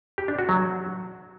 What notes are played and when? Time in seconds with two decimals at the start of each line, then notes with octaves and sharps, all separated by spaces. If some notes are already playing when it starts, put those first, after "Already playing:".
0.18 G4
0.28 D4
0.39 F#4
0.49 F#3